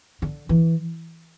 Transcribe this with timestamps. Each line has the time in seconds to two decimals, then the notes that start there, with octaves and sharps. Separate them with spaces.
0.22 D3
0.49 E3